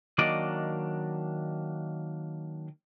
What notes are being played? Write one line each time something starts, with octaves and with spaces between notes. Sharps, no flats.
D#3 F#3 A#3 D4 D5 D#5